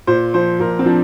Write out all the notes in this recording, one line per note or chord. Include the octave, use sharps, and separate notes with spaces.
A#2 C5
F3 C5
A#2 A#4
C4
F3 D4